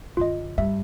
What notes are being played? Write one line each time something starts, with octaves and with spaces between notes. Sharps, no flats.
F#2 D3 F4 D#5
G2 E5